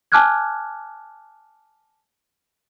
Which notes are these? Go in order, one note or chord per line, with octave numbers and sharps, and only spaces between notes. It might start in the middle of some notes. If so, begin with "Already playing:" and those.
G#5 A5 D6 F6 F#6 G#6